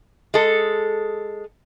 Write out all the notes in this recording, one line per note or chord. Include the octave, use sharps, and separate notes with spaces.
G#3 A4